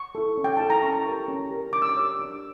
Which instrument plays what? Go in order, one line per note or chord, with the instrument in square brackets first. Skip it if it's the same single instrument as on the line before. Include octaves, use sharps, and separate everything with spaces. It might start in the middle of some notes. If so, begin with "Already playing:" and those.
Already playing: [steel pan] C#6
E4 A4
C#4
G5
E4 A4 A5
A#5
C#4 C#6
G4 A#4
C#4
G4 A#4
D4 D6
E6
D6
G4 C#5
D4